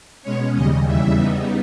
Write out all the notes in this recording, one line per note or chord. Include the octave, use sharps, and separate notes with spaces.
B2 G#3 C#4 C#5
D#2 C#3 G3 D#5
E2 C#3 E3 G3 E5
C#3 G3 B3 D#4